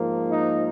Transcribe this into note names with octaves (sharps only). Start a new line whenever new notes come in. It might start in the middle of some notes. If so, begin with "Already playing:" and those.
Already playing: G#2 F3 A#3
D#4